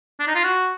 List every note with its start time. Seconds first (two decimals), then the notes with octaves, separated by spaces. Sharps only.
0.20 D4
0.28 D#4
0.35 F4
0.44 F#4